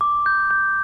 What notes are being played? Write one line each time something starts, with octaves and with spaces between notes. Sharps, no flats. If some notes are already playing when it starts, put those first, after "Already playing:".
D6
G6
G6